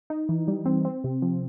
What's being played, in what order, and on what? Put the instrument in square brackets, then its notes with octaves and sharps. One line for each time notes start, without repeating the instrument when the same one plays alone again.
[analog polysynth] D#4
E3
G3
C4
C4
C3
F3